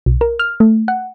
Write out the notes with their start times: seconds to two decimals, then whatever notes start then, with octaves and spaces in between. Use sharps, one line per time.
0.06 B1
0.21 A#4
0.39 F6
0.60 A3
0.88 F#5